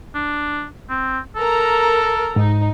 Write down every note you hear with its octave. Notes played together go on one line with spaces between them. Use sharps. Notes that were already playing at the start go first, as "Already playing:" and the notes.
D4
C4
A4 A#4 A#5
G#2 D#4